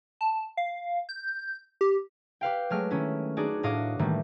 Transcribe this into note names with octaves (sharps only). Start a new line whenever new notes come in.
A5
F5
G6
G4
G4 B4 F5 G5
F#3 G#3 A3 F6 D7
D#3 C#4 E4
D4 D#4 F#4 G#4 D5
A2 F#4 D#5 F5 D6
A2 D#3 E3 G3 A3 A#3